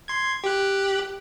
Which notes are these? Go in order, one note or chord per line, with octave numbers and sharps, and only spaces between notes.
C6 G#6
G4 F#6